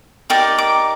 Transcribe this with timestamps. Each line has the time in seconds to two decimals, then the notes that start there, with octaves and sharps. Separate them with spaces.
0.30 D#4 G4 A#4 D5
0.58 D6